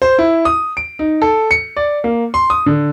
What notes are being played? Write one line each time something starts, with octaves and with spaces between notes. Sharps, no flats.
C5
E4
D#6
D7
D#4
A4
C#7
D5
A#3
C6
D#6
D3